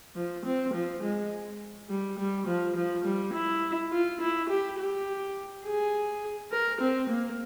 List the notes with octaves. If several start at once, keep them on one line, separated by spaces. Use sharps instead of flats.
F3
C4
F3
G#3
G3
G3
F3
F3
G3
E4
F4
E4
G4
G4
G#4
A#4
C4
A#3